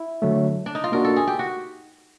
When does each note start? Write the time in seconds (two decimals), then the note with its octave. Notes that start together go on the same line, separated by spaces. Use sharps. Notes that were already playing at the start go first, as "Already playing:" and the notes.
Already playing: E4
0.22 D3 F#3 A3
0.66 D4
0.75 D#4
0.84 F4
0.92 A#3 D4 F#4 A#4
1.05 A4
1.16 G#4
1.27 G4
1.39 F#4